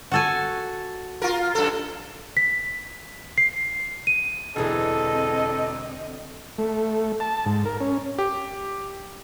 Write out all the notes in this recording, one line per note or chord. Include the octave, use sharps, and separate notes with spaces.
F#4 A4 G#5
F4 A#4
F#2 A4
B6
C7
D#7
E1 D3 E3 C4 G#4 A4 D#5
A3
A5
G#2
A#4
C#4
G4